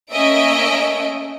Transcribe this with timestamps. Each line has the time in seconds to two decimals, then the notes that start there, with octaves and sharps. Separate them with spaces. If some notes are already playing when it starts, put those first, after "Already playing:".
0.12 A3 A#3 C#4 D#5 E5 D7